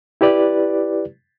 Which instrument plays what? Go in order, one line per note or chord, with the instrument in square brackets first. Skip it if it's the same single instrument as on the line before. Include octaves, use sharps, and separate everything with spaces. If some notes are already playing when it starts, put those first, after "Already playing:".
[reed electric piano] E4 G4 B4 D5